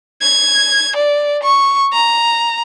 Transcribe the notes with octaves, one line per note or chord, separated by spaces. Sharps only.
G#6
D5
C#6
A#5